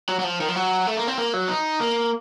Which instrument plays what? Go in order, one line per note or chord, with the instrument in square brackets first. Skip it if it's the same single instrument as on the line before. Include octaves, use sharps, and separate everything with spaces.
[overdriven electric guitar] F#3
F#3
F3
D#3
F3
F#3
A3
A#3
C4
A#3
F#3
D#4
A#3